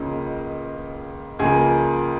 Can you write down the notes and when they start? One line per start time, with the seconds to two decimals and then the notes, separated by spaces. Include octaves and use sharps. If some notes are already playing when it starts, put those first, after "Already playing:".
Already playing: C#2 C#3 F3 A#3 C#4 D#5
1.39 C#2 C#3 F3 A#3 G#4 G#5